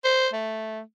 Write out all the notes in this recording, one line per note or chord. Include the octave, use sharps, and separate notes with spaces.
C5
A3